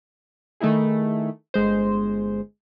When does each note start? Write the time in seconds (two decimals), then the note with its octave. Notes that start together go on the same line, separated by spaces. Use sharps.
0.60 D#3 A3 D#4 E4 G#4
1.54 G1 G#3 C5